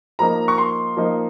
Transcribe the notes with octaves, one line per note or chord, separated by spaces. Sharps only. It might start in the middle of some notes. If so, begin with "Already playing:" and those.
F3 A#3 D#4 A#5
C#6
C6
F3 A#3 D#4